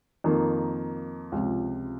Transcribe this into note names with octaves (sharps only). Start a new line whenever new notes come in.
F2 D#3 A#3
C#2 C3 F3